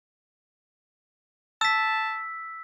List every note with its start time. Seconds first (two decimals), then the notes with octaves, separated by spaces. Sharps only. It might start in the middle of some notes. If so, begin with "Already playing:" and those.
1.61 A5 E6 B6